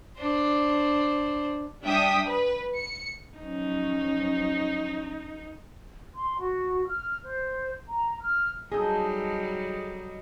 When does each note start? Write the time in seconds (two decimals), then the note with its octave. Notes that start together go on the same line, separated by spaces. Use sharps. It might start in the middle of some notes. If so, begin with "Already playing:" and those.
0.18 D4 C5
1.83 G3 D4 E5 G5 D#6 B6
2.25 B4
2.75 C#7
3.39 F3 F#3 C#4 D#4
6.16 C6
6.39 F#4
6.86 F6
7.23 C5
7.89 A#5
8.20 F6
8.72 F#3 G3 D#4 G#4 A4 D#5